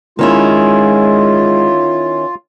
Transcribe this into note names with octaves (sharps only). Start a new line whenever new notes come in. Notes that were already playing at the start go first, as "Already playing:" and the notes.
D#3 G#3 C#4 E4 F4